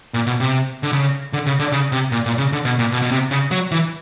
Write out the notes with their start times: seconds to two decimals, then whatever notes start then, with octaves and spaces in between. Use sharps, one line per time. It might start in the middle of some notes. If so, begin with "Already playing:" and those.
0.14 A#2
0.27 B2
0.40 C3
0.83 D3
0.93 C#3
1.33 D3
1.46 C#3
1.59 D3
1.72 C#3
1.92 C3
2.12 A#2
2.26 A#2
2.38 C#3
2.52 D3
2.65 B2
2.79 A#2
2.92 B2
3.02 B2
3.11 C3
3.31 C#3
3.51 F#3
3.71 E3